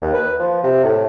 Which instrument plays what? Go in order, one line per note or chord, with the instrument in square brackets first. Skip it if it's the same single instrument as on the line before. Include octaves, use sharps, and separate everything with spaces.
[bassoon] D#2
B4
F3
C3
A2